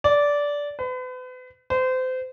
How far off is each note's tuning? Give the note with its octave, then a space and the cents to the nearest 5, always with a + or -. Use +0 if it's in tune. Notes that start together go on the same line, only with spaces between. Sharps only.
D5 -15
B4 +40
C5 -30